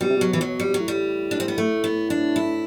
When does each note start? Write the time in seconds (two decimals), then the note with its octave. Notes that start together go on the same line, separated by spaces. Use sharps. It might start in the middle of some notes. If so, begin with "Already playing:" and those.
0.01 B2 G3
0.09 C3
0.16 B2 F#3
0.33 E3
0.41 F#3
0.60 G3
0.68 B2
0.74 F#3
0.79 A2
0.88 G3
1.31 D4
1.40 C4
1.48 B3
1.58 A3
1.84 B3
2.10 D4
2.36 E4